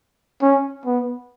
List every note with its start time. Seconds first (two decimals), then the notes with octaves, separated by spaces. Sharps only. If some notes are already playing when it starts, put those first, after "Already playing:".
0.42 C#4
0.86 B3